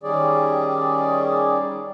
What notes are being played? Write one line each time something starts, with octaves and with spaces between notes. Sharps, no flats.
D#3 G3 C#4 G#4 D5